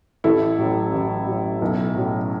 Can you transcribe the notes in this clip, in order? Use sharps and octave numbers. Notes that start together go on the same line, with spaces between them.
A1 E4 A4
A2 F#3 C#4
A1
A2 F#3 C#4
B1
A2 F#3 C#4